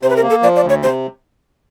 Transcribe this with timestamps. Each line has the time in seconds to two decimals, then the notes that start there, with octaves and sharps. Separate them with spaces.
0.03 C3 C5
0.10 B4
0.16 A#4
0.23 A#3
0.30 A4
0.42 F3 D5
0.56 D5
0.63 D2
0.69 C#5
0.83 C3 C5